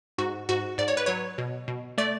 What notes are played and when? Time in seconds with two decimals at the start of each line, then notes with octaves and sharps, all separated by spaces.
0.18 G#2 F#4
0.49 G#2 F#4
0.78 G#2 D5
0.88 C#5
0.97 B4
1.06 F#3 C#5
1.38 B2
1.68 B2
1.98 A3 D5